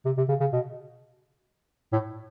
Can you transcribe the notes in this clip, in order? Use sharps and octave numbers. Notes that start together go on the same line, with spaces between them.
C3
C3
C#3
C#3
B2
A2